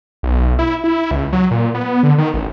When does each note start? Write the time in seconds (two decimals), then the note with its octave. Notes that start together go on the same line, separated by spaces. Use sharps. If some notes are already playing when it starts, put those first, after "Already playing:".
0.23 B1
0.59 E4
0.84 E4
1.11 C#2
1.33 F#3
1.51 A#2
1.74 B3
2.03 D3
2.18 D#3
2.34 A1